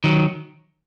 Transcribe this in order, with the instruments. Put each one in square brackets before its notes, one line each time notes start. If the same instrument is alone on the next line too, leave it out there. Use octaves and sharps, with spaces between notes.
[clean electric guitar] D#3 F#3